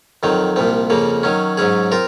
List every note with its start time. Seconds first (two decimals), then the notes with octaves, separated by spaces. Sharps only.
0.23 F2 D#3 F#3 C4
0.56 C2 A#2 F3 C4
0.90 F2 C#3 F3 A#3
1.23 D#3 F#3 C#4
1.57 G#2 F#3 C#4 G#4
1.92 C4 F4 A#4